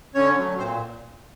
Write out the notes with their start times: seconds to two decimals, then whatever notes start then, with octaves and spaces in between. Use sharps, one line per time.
0.15 D3 C#4 C#5
0.37 F#3 A3
0.58 A#2 C4 C5